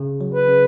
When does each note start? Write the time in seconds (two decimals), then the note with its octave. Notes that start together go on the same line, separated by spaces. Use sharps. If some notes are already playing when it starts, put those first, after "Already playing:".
Already playing: C#3
0.21 F#3
0.35 B4
0.49 C#3